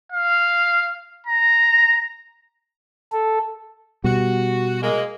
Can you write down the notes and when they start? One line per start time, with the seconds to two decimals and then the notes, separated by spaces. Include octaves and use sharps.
0.12 F5
1.26 A#5
3.12 A4
4.04 B2 G3 F#4
4.82 G#3 A#3 D#5